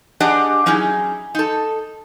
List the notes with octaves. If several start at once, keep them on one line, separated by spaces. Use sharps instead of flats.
D4 G4 G#4 D5 D#5 F#5
F#3 C#4 D#4 E4 G#4
D#4 A4